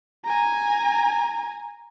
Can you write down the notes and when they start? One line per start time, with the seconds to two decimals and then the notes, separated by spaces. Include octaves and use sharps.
0.25 G#5 A#5